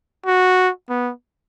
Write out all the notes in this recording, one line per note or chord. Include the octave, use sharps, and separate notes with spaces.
F#4
B3